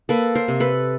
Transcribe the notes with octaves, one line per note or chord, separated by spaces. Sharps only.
A#3 A4 B4
A#4 C5
C3
A4 B4